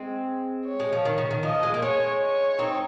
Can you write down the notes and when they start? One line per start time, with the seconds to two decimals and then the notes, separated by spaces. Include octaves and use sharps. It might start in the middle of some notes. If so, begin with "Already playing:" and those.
Already playing: G#3 C4
0.67 C#5
0.80 G#3
0.93 F3
1.05 D#3
1.18 C#3
1.31 D#3
1.43 F3 D#5
1.63 G#3
1.74 A#3
1.82 G#3 C#5
2.21 C#5
2.59 C4 D#4